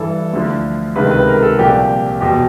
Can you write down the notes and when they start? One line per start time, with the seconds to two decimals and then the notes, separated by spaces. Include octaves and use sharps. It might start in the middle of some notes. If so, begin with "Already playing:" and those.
Already playing: G2 E3 A4
0.33 D2 D3 F3
0.95 C#2 C3 D#3 B4
1.11 B4
1.27 A#4
1.42 A4
1.58 C2 A#2 F3 G4
2.21 E2 B2 G4